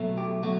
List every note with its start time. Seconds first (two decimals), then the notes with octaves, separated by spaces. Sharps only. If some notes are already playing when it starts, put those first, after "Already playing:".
Already playing: B2 F#3 A3
0.18 G4
0.43 F#3 A3 F#4